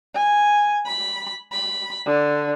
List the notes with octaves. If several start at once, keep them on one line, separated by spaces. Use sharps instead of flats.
G#5
B5
B5
D3